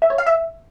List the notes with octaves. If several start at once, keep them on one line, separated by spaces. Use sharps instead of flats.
E5
C#5
F5
E5